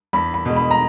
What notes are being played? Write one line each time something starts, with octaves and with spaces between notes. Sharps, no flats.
E2 B5
B5
B2 G#3
B5
A#5